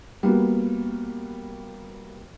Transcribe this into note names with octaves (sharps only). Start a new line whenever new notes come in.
G3 A#3 B3 F#4